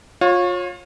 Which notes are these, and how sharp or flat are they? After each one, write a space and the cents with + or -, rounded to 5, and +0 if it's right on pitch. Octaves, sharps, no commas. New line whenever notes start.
F4 +30 C#5 -20